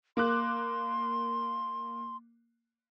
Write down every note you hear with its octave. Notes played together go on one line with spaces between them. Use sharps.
A#3 C6 D6 F#6